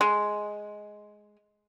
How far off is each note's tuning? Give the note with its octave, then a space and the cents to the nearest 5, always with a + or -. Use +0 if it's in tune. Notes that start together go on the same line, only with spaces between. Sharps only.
G#3 +5